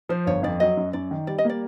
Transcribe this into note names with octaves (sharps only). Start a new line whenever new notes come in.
F3 C5
G1 C#5
F2 D5
F#3 D#5
F#2
F#2 D5
D#3
G3 D5
D#5
A#3 D5